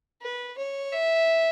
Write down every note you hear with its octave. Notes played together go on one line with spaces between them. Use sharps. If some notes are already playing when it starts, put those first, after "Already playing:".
B4
C#5
E5